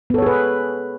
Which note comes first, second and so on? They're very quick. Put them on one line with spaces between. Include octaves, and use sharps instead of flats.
B3 A4 C#5 G#4 B4